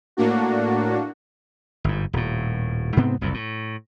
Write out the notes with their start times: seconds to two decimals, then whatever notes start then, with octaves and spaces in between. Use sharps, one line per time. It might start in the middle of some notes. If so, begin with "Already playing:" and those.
0.17 A2 A#3 D4 F#4
1.84 G1 G#2
2.13 D#1 A2
2.97 G#2 C3 B3 C4
3.21 F#1 C2 F2 G#2
3.34 A2